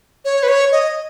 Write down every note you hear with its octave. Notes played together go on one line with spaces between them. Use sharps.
C#5
B4
C#5
D#5